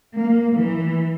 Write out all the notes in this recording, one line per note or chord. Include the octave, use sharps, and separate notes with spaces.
A#3
E3